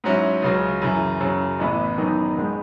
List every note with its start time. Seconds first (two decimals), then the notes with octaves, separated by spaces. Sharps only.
0.04 G#2 F#3 C#4 E4
0.42 C#2 C#3 F#3
0.82 F#2 C#3 E3
1.20 F#2 C#3 F#3
1.59 A1 A2 E3 B3 E4
1.98 F#2 D#3 F#3 B3 D#4
2.37 G#2 D#3 G#3 B3